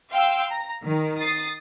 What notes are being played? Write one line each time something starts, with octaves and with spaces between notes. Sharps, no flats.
F5 G5 C6 E6
A#5
D#3
D#6 A6 C7